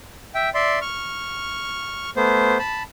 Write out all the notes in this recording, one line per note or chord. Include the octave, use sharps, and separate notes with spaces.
E5 G5
D5 E5 C6
C#6 F6
A3 B3 C5
A5 B5